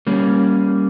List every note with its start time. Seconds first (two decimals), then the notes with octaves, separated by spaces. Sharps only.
0.07 G3 A#3 C#4